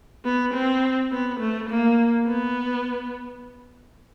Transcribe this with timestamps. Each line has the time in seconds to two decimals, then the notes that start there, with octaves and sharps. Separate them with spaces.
0.25 B3
0.54 C4
1.12 B3
1.40 A3
1.69 A#3
2.27 B3